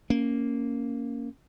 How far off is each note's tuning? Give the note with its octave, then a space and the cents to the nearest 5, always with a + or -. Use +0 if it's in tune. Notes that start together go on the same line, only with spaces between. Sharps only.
A#3 -5 C#4 +0